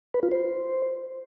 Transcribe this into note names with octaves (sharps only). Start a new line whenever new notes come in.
B4
F4
C5